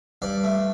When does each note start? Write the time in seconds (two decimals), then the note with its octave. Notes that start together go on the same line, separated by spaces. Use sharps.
0.22 G2 D5
0.44 A3